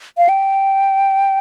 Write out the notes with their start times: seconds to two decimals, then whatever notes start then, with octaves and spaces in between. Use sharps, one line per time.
0.18 F5
0.29 G5